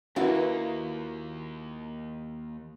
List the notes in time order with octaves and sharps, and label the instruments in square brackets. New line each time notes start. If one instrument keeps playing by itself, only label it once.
[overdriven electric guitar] D#2 [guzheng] A#3 [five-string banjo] E4 F#4 B4